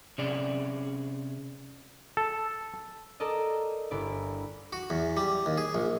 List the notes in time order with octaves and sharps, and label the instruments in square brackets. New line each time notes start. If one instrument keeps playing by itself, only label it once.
[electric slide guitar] C3 C#4 G#4 D5
[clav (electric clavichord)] A4
[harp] A4 A#4 D5 D#5
G1 E4 D5
[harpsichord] F#4
E2
G3
D#2
G#4
A#1